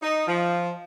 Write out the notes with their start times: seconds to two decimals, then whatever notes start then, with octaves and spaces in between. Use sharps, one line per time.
0.02 D#4
0.27 F3